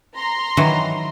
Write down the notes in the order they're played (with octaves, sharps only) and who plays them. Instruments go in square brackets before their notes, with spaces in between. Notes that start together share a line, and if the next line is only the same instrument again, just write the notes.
[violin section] A#5 C6
[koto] D#3 E3 F#3